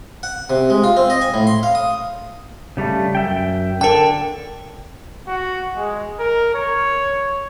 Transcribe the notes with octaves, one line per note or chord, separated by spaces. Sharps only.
F#5
C3
G#3
F4
C4
D#5
G#5
A2
C6
F5
D#6
C#3 G3 A3
F#2 E5 G5
D3 A4 A#4 G5
F#4
G#3
A#4
C#5